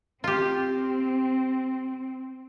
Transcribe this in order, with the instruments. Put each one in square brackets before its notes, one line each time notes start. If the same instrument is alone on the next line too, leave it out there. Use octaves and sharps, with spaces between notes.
[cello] C4 [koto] F4 G4